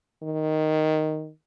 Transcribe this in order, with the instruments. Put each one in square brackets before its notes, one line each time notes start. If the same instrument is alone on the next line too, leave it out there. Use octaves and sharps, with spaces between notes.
[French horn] D#3